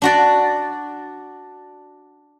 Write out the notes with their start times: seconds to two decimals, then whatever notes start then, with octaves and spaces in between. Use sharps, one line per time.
0.02 D4 F#4 D5